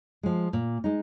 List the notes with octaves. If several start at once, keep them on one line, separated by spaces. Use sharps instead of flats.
F3 G#3
A#2
G#3 D#4